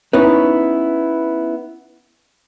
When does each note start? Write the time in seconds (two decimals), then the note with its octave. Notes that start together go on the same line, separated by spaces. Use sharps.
0.13 B3 C#4 D#4 E4 B4